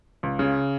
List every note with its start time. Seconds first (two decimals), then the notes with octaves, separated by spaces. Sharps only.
0.23 C#2
0.39 C#3